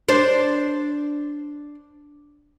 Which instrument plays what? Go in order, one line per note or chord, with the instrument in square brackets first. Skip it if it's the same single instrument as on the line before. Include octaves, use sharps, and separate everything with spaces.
[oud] D4 C5